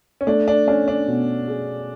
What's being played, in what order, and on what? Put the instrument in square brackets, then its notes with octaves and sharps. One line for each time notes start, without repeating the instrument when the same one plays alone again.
[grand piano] C#4
[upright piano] A3 [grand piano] D4
[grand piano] D4
[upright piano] C#4 [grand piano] D4
[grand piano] D4
[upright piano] B2
G#4